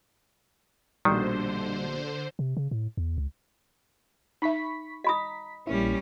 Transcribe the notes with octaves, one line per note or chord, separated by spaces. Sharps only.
A#1 B2 D3 D#3 G3 C5
C3
C#3
A2
E2
C#2
D#4 E5 B5 C#6 B6
D#5 A#5 B5 D#6 B6
A#1 G3 A#3 C#4 E4